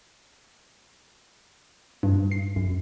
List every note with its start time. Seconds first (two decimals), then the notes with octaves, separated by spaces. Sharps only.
2.03 G2
2.31 C7
2.56 F#2